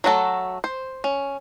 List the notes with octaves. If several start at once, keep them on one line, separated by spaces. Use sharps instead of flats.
F#3 A3 F#4 A4
C5
C#4